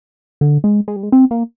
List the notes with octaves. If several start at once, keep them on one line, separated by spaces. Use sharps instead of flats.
D3
G#3
G#3
G3
G#3
C4
A#3